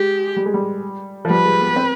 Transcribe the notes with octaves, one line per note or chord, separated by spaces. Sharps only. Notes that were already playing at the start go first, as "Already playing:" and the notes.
Already playing: G#3 G4
G3
G#3
G3
F3
G3 B4
G#3
B3
C4